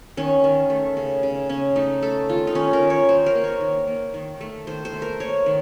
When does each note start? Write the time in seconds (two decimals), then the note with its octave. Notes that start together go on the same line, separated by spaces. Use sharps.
0.17 D#3 C#4
0.44 D#3
0.70 A3
0.97 C#3
1.23 C#3
1.49 C#3 C#4
1.76 A3 D#4
2.02 A3 A4
2.29 D#3 F4
2.47 D#4
2.55 D#3 C#4
2.73 A#4
2.82 D#3
2.90 C#5
3.09 D#3 C5
3.26 A#4
3.35 A#3
3.44 C#5
3.61 D#3
3.87 A#3
4.14 D#3
4.41 A3
4.67 D#3 C5
4.85 C5
4.93 A3
5.02 A#4
5.20 A#3 C#5
5.46 D#3